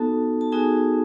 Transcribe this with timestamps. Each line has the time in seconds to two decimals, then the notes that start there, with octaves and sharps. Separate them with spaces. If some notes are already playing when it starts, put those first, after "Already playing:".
Already playing: B3 D#4 F#4 A4 A5
0.41 A5
0.52 B3 D#4 F#4 G#4 G#5